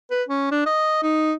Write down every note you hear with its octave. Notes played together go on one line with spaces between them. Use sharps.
B4
C#4
D4
D#5
D#4